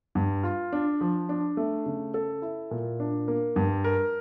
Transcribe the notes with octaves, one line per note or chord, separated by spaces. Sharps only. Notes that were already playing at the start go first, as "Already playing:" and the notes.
G2
F4
D4
F3
D4
A3
C#3
A4
E4
A#2
D4
A#3
G2
A#4